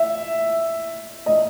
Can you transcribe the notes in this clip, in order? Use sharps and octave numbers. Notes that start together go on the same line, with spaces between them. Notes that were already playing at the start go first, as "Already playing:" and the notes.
Already playing: E5
D#5